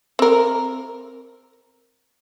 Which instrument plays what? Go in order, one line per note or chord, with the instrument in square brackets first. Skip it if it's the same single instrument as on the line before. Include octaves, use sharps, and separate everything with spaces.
[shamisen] C4 A#4